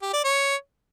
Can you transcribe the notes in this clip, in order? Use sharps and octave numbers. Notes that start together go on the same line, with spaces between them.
G4
D5
C#5